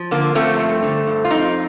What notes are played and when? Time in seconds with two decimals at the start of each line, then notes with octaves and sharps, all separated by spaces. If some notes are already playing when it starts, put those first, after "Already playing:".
Already playing: F3
0.11 D3 A#3
0.35 F3 A3 C4
0.59 G2
0.82 D3
1.07 G2
1.25 F4
1.30 F2 C4 D#4